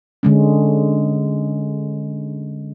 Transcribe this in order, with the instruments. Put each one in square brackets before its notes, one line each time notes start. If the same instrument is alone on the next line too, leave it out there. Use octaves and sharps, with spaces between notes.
[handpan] D3 G#3 C#4